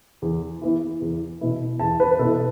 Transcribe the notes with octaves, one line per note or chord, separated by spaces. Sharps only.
E2
E3 B3 E4
E2
B2 B3 E4
E2 A5
B4
B4
B2 B3 E4 A4